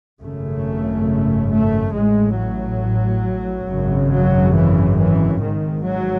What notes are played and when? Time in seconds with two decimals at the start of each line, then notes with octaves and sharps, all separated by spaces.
0.21 G#1 F#2 C#3 A3
1.52 A3
1.94 A1 A2 G#3
2.38 F#3
3.68 G#1 F#2 C#3
4.12 F#3
4.56 E3
4.98 E3
5.41 G#1 G#2 D#3
5.85 F#3